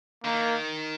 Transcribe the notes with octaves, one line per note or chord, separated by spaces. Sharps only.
D#3 A#3